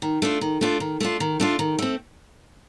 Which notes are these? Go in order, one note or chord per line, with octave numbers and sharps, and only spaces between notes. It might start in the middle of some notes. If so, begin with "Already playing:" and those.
D#3
A3 D4 F4
D#3
A3 D4 F4
D#3
A3 D4 F4
D#3
A3 D4 F4
D#3
A3 C4